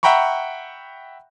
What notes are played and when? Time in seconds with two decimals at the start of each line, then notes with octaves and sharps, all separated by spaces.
0.03 E5 F#5 G5 A#5 B5 C#6